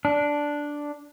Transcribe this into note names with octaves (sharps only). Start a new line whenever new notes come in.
D4